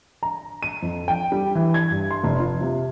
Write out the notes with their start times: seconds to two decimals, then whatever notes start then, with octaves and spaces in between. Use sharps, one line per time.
0.23 A#5
0.63 D#7
0.82 F2
1.08 G5
1.32 G3
1.55 E3
1.74 G#6
1.90 G2
2.11 C6
2.23 F1
2.40 F4
2.61 C3